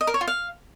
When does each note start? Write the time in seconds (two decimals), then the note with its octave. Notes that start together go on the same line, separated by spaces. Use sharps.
0.01 D#5
0.07 A#4
0.14 C#5
0.21 F4
0.28 F5